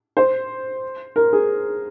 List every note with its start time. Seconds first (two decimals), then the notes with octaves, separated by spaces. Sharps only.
0.17 C5
1.16 A#4
1.33 G#4